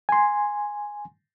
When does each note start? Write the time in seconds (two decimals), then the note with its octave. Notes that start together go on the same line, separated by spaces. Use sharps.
0.09 G#5 C6